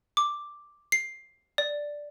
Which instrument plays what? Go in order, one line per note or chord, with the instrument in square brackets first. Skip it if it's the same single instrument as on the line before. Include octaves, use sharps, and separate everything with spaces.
[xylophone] D6
C7
D5